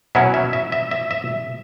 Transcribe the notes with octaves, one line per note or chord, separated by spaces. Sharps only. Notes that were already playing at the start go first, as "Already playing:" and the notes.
B2 F#3 C#4 E4 E5
E5
E5
E5
E5
E5